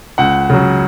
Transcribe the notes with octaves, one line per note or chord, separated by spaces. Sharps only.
C#2 F#5
C#3 F#3